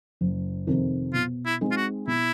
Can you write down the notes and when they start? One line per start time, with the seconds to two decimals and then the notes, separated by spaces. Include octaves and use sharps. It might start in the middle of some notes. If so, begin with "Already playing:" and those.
0.21 F#1
0.67 F2 C3 D#3
1.14 B2 F4
1.46 E4
1.61 G#3 C4 D#4 G#4
1.71 F4
1.76 F#4
2.07 B2 E4